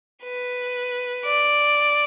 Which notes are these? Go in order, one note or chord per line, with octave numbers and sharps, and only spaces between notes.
B4
D5